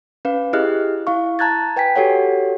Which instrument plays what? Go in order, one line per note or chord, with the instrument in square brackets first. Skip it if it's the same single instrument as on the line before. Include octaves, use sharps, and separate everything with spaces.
[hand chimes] C#4 B4 F5
E4 G4 G#4 D#5 F6 F#6
E4 F5 C#6
A5 A#5 F#6 G#6 A6
B4 G5 G#5 B6
F#4 G4 A4 C#5 F#5